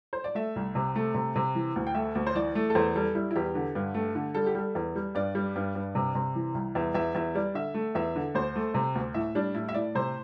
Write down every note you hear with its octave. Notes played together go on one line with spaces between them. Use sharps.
C5
D5
A3 E5
C2
C3
A3
C3
C3
E3
D2
G5
A3 E5
D2
C5
E3 D5
A3
A4
E2 C5
G3 A4
G3 E4
E4
E2 G4
D3
G2
A3
D3
G3 A4
G4
G3 A4
E2
G3
G2 D5
G3
G2
G2
C3
C3
E3
C2
E2 E5
E2 E5
E2 E5
G3 D5
D3 E5
A3
E2 E5
D3
D2 C5
A3
C3
D2
A2 E5
G3 D4
A2 E4
E5
A2 D5
C3 C5